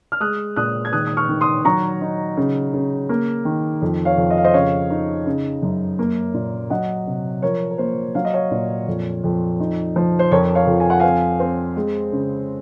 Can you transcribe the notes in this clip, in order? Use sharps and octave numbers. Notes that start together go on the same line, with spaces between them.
F6
G#3 D#6 F#6
A#2 D#6 F#6
G#6
D#3 D#6 F#6
D#6
C#6 F6
D#3
C6 D#6
F#3 A#5 C#6
D#4
C#3
C#3
A#3
D#3
F2
C#5 F5
F2
D#5
F5
C5 D#5
C#3 C#5 F5
D#4
C#3
F#2
A#3
A#2
F#3 D#5 F#5
C3
F3 A#4 C#5
A#4
A#3 C5
F#3 F5
D#5
C#5 F5
A#2
F2
F2
D#4
F3
C5
F2 A#4 C#5
C#5 F5
F2
G#5
F#5
C4 F5 G#5
C4
G#3
C#3